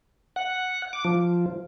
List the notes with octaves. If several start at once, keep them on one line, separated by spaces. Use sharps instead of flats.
F#5
D6
F3